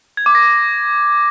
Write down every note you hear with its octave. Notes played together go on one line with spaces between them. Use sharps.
G#6
D6
A#6